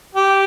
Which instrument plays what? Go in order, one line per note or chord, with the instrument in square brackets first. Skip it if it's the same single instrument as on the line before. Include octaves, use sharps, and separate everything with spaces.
[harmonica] G4